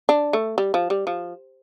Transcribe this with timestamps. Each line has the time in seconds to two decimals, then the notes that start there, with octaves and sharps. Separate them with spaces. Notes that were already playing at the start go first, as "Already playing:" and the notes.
0.09 D4
0.33 A3
0.58 G3
0.74 F3
0.90 G3
1.07 F3